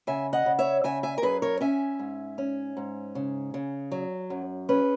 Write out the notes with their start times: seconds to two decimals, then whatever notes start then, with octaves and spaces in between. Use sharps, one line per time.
0.07 C#3 E5 G#5
0.33 D#5 F#5
0.46 C#3
0.59 C#5 E5
0.84 C#3 E5 G#5
1.03 E5 G#5
1.18 A#4
1.22 F#2 G#4 B4
1.42 A#4 C#5
1.61 C#4 E5 G#5
1.99 G#2
2.38 C#4
2.77 G#2
3.15 C#3
3.54 C#3
3.91 F#3
4.30 F#2
4.69 C#4 G#4 B4